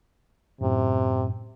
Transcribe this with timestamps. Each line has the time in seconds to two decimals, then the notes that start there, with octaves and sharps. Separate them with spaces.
0.61 F#2 A2 C3